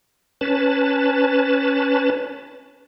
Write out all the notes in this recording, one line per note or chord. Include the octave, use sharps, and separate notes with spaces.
C#4 B4 A5